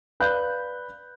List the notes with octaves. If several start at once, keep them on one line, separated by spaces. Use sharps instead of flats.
B4 D5 F5 B5 F#6 G6